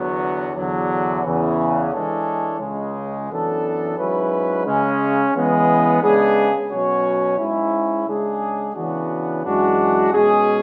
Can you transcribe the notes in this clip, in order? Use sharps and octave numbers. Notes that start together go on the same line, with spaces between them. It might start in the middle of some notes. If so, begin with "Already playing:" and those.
Already playing: E2 D3 F#3 B3 F#4
E2 D3 F#3
E2 C#3 E3
E3 G#3 D4 A4 C#5
C#2 C#3 G#3
F#2 E3 B3 D4 A4
G#2 F#3 C#4 E4 B4
C#3 G#3 C#4
C#3 E3 G#3 B3
C#3 G#3 B3 D4 G#4
B2 F#3 C#4 F#4 C#5
G#2 G#3 C#4 E4
C#3 G#3 D4 G#4
C#3 E3 B3 D4 F#4
F#2 E3 G#3 D4 F#4
B2 G#3 C#4 G#4